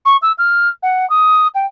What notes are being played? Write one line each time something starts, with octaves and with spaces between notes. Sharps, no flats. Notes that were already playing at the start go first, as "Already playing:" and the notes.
C#6
E6
F6
F#5
D#6
G5